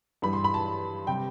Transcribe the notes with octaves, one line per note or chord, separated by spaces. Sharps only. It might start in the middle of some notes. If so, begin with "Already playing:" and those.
G2 E3 G3 B5
C6
B5
A5
C3 G3 G5